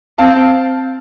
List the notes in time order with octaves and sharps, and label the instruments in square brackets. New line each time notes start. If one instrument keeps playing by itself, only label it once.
[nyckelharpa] C4 [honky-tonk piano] F5 A5